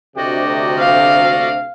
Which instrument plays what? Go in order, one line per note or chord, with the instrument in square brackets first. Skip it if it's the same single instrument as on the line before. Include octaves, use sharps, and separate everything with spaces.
[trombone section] D2 C3 [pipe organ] F#4 D5 D#5 [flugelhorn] G4
[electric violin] F5